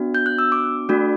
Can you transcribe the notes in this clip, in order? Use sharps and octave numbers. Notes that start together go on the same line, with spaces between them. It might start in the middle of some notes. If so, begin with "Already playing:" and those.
Already playing: B3 D4 F#4
G6
F#6
E6
D6
A3 D4 F#4